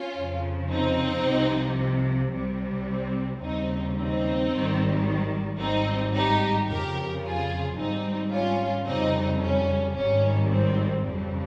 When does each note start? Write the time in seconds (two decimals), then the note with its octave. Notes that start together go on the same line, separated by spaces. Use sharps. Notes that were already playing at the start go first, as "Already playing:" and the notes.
Already playing: C#4 F4
0.15 F2 C#3 F3
0.69 C4 D#4
1.23 C2 C3 F3
2.32 C2 C3 G3
2.87 C4
3.41 D#2 C#3 G3 C4 D#4
3.96 C4 D#4
4.50 G#1 G#2 D#3 G3
5.59 G#1 G#2 G3 C4 D#4
6.14 D#4 G4
6.68 F2 C#3 F3 G4 A#4
7.23 F4 G#4
7.77 G#1 G#2 G3 C4 D#4
8.31 C#4 F4
8.86 F2 C#3 G3 C4 D#4
9.41 C#4
9.95 G#1 G#2 D#3 G3 C#4
10.49 C4
11.04 F2 C#3 G3 C4